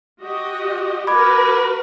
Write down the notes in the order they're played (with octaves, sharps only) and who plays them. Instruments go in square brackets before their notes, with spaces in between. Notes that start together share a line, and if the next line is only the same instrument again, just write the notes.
[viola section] F#4 G4 D#5
[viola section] F#4 A#4 B4 [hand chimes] B5 D6 G#6